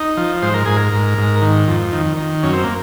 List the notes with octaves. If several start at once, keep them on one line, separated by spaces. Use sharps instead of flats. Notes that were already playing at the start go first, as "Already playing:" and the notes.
Already playing: D#4
F3
G#2 C5
A#4
G#2 G#4
A#4
G#2
G#2
D#3
F2
D#3
D#3
F#2 C#4
C4
A#3